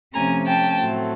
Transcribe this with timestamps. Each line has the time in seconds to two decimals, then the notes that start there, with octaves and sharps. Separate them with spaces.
0.14 C3 F3 A3 C#4 G#5 A#5
0.46 G5 A5
0.79 A2 F#3 A3 C4